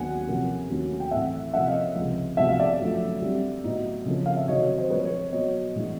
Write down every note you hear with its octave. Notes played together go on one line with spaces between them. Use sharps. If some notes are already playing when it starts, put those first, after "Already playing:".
Already playing: D#2 D#3 F#3 B3 D4 F#5 G#5
C3 F3 A#3 C#4
D#2 D3 F#3 A3 C#4
G5
A2 E3 A3 C4 E5 F#5
C3 F3 A#3 C#4 E5 F#5
D#5 F5
C#2 C3 F3
D2 C3 F3 G#3 B3 E5
F5
D5 E5
F#2 D3 F3 A3
D3 G3 C4
A2 F#3 B3 D#4
C#3 F3 A#3
F5
E5
C3 D#3 F#3 C#5 D#5
C5
D3 F3 G#3 B4 C#5
B4 C#5
B2 F#3 B3 C#5 D#5
A2 E3 G#3 B3 D4